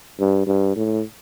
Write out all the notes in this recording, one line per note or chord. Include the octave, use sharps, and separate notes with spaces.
G2
G2
A2